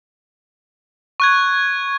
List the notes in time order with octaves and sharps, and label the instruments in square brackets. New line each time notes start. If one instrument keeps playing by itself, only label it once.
[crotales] C#6 F#6 G#6